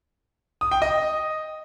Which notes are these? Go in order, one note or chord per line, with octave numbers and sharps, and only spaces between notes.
D#6
G5
D#5